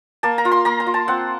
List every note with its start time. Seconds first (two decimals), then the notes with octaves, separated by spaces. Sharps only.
0.23 A#3 A5
0.38 A#5
0.45 F4
0.52 C6
0.65 A#3 A#5
0.80 A#5
0.86 F4
0.94 A5
1.08 C4 F#5